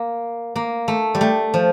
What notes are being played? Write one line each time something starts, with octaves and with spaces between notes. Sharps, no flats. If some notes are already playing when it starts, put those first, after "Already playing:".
Already playing: A#3
A#3
A3
G3
A3
F3